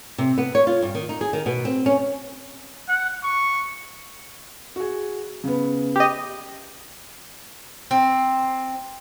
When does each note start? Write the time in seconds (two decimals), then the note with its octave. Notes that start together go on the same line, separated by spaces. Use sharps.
0.18 C3
0.38 B3
0.55 C#5
0.67 F4
0.82 G2
0.95 D#3
1.09 D#4
1.21 G#4
1.33 D#3
1.46 B2
1.65 C4
1.86 C#4
2.88 F#5
3.24 C#6
4.76 F#4 G#4
5.44 C#3 B3
5.96 G4 D#5
7.91 C4